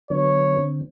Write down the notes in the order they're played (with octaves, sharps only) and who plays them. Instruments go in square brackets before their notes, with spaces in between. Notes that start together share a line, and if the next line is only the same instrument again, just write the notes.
[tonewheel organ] D3 F#3 B3 [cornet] C#5
[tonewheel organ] D3 C4